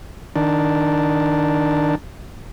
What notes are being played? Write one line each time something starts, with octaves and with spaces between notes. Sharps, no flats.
D#3 D4